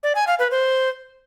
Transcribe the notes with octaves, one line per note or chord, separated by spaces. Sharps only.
D5
G#5
F5
B4
C5